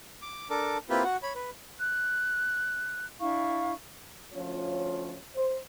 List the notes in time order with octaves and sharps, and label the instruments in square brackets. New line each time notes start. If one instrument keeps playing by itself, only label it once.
[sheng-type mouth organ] D6
D4 A4 A#4 D6
A#3 C4 E4 F4 G4 B4
F#4 F#5
C#5 B5
B4
[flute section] F#6
D4 E4 F5 C#6
[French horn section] D2 F3 C#4 F4 C#5
C5